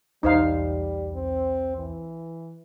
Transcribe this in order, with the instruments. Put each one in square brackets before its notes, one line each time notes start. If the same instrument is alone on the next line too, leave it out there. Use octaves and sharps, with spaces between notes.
[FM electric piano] B1 E2 [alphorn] G3 [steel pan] D#4 C5 F5
[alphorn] C4
E3